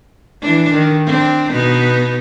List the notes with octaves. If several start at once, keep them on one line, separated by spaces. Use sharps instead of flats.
E3 D4
D#3
C4 D4
B2 B3 D#4